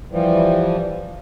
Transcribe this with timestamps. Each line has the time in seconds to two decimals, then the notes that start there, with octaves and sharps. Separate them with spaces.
0.11 E3 F3 G3